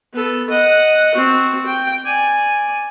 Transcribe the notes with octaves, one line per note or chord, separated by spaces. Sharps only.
B3 A4
D#5 F#5
C4 F#4
G5
D5 G#5